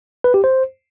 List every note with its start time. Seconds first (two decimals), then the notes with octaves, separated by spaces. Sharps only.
0.24 B4
0.34 G4
0.44 C5